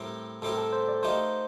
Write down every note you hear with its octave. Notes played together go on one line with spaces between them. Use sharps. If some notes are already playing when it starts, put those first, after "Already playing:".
Already playing: A2 G3 C4 G4 A#4
A2 G3 C4 G4 A4 A#4
A4
C5
D5
F3 A3 D#4 G4 A#4 C5